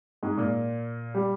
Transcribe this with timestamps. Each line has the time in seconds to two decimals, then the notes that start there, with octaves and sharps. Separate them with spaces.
0.23 G#2 G#3
0.38 A#2 A#3
1.15 G3